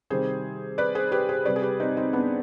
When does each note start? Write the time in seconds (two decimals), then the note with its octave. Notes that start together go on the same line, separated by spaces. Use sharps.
0.10 C3 D#3 G3 G#4 C5
0.78 B4 D5
0.95 G#4 C5
1.12 G4 B4
1.29 G#4 C5
1.45 C3 G3 B4 D5
1.56 G#4
1.62 G4 B4
1.80 C4 D#4
1.97 C4 D#4
2.13 B3 D4